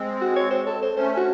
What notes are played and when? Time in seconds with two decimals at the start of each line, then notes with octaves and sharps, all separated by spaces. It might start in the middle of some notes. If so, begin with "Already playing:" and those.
Already playing: G#3 C4
0.21 F#4
0.36 C#5
0.51 C5
0.67 A4
0.82 C5
0.96 A3 C#4 C5
1.17 F#4